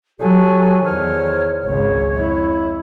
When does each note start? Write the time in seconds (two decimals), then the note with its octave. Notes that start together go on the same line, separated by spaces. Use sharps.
0.20 F#3 G4 A4 G#5
0.84 E2 D#3 C5 C#5 F6
1.64 G#1 C#2 C#5
2.12 F2 E4